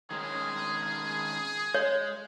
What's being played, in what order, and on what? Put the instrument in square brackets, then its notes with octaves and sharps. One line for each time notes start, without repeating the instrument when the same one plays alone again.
[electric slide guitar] D#3 G#3 C#4 [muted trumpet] G#4
[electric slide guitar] G#3 [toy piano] C#5